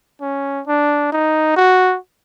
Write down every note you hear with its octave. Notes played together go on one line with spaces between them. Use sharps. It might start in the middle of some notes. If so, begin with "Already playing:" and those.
C#4
D4
D#4
F#4